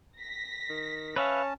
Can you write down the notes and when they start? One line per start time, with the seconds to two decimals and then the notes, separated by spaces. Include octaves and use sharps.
0.19 A#6 B6
0.69 D#3
1.16 C#4 B4 C#5 E5 F5 A5